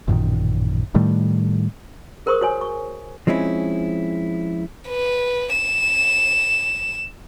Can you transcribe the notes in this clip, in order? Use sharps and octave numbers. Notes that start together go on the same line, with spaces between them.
A1 F#2 A#2 D#3
A2 D#3 G3 A3
G#4 A#4 C5 C6 C#6 D#6
F#4 C#5 G#5
C#6
F3 G#3 C4 C#4 E4
B4
E7